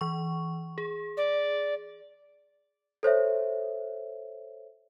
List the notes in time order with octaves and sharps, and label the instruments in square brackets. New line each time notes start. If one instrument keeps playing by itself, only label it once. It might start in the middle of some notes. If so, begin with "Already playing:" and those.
[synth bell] E3 C#6
G#4
[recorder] D5
[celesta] A4 C5 C#5 E5